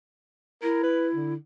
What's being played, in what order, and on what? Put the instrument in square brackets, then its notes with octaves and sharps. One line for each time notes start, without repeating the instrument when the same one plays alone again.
[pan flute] E4 [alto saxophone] A#4
[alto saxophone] B4
D3